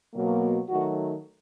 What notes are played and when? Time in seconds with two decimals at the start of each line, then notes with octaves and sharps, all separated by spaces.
0.14 B2 F#3 A#3
0.69 D#3 F#3 A3 F#4